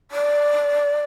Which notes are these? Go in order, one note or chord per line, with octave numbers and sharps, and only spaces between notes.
D5